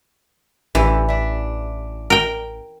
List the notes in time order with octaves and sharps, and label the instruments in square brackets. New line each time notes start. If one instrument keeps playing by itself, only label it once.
[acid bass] A1 [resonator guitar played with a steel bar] D3 E4 G4 [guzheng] E3
[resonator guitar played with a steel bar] D4 E5
[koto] A#4 G5